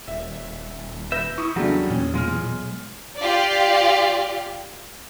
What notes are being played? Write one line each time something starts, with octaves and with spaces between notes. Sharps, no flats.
D#1 E5
B4 E5 G6 A#6
E4 C#6 D#6
E2 C#3 F#3 G3 A3 D4 F#4
A#2 C#4
B1 G#3 F4 F6
F4 G4 D5